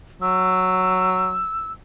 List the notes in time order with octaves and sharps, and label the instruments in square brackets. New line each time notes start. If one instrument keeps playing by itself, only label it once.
[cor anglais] F#3 [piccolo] E6